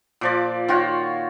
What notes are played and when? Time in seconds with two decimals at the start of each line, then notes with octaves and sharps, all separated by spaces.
0.21 A#2 F3 D5
0.69 D#3 F4 F#4 C#5